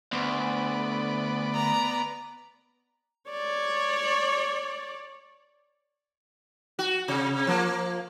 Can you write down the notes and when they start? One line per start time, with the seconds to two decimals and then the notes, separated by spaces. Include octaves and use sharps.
0.13 D2 B3 D5
1.55 A#5
3.30 C#5 D5
6.79 F#4
7.08 C3
7.47 F3 A#3